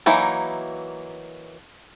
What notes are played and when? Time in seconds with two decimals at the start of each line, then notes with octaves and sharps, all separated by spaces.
0.06 E3 F#3 A#3 D#4 E4